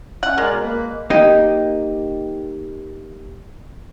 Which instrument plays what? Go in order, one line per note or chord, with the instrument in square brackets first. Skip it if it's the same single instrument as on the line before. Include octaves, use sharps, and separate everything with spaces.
[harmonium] C#4 [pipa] F#5
[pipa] G#3 [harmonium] A#4 D5
[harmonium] B2
A#3 B4
[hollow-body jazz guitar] A#3 D#4 G4 D#5